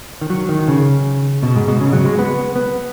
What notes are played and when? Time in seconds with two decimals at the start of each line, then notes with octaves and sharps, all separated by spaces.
0.21 D#3
0.30 F#3
0.49 D#3
0.68 C#3
1.43 B2
1.56 G#2
1.68 B2
1.81 C#3
1.93 F#3
2.05 G#3
2.19 B3
2.56 B3